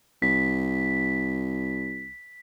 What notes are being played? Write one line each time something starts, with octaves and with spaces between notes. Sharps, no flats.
C2 B6